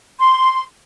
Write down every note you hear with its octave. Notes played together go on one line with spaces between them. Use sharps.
C6